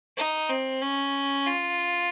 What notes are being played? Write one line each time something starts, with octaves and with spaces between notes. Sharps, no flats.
D#4
C4
C#4
F4